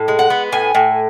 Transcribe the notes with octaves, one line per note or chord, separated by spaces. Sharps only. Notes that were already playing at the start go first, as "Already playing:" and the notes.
Already playing: A2
G#3
F#5
B3
A2 G#5
A2